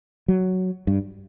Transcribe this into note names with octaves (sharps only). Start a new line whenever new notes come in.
F#3
G2